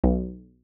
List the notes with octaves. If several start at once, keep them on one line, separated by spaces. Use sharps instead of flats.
B1